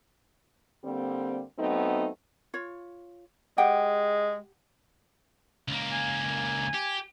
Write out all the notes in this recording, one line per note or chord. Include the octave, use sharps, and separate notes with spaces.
D3 G3 A#3 C4
F#3 A3 B3 C4 D#4
F4 C#5
G#3 G4 F#5 G5
C#2 A#3
G#5
G4